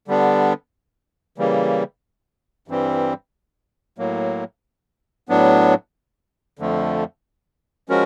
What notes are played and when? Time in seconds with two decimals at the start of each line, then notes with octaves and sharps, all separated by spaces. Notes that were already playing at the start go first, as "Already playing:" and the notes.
0.08 D3 G3 B3 D4
1.38 C#3 E3 G3 A#3
2.68 G2 E3 G3 C4
3.98 A2 F#3 A#3
5.29 A2 F#3 B3 D4
6.59 F2 D3 F3 A3
7.89 F3 G#3 C#4 F#4 A#4